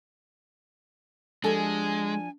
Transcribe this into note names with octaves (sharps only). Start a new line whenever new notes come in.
F3 G#3 D4 G4 A4 G#5